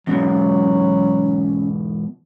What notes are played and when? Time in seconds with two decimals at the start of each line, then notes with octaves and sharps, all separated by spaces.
0.07 E2 G#2 B2 F#3 C#4